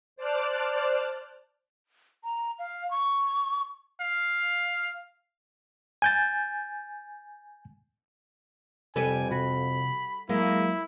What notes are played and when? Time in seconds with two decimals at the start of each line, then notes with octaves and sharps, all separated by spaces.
0.16 C5 D5 A5 D6 F6 F#6
2.24 A#5
2.59 F5
2.91 C#6
4.01 F5
6.02 G#5 G6 A6
8.96 F2 C3 G3 A4 B4 G#5
9.31 C3 F#4 B5
10.29 F#3 G#3 A#3 E4